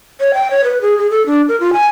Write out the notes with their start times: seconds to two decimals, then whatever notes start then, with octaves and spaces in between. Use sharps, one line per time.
0.20 C#5
0.34 G5
0.51 C#5
0.64 B4
0.82 G#4
0.98 G#4
1.10 A4
1.26 D4
1.48 A#4
1.60 F4
1.73 G#5